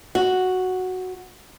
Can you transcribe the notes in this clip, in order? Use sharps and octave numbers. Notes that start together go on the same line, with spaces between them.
F#4